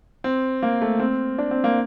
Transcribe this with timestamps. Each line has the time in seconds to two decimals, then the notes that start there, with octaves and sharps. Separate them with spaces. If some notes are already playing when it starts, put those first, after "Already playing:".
0.24 C4
0.63 A#3
0.82 A3
0.99 C4
1.38 D4
1.51 C4
1.64 A#3